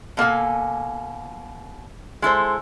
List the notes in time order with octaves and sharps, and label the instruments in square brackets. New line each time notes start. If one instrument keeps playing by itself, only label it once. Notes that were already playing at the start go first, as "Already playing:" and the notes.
[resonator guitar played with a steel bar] B2 A#3 A4 G#5
G#3 E4 A4 C5